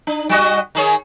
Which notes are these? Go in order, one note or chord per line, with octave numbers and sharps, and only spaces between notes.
D4
G3 F#4 D#5
D#3 G#4 C#5